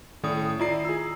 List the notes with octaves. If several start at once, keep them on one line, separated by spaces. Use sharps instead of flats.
A2 D#3 D#6
E4 F4 D5 A#5 C7
G#4 E6